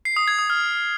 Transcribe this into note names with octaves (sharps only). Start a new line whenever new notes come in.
C7
D#6
G#6
D#6
F6